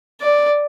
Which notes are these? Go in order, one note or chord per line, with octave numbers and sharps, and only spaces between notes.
D5